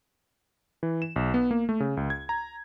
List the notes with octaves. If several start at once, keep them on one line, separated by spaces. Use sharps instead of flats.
E3
E7
B1
B3
A#3
A3
C#3
C#2
G#6
A#5